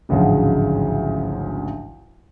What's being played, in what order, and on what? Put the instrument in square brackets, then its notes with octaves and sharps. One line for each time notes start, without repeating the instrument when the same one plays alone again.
[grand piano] A1 D2 G#2 C#3 F3 F#3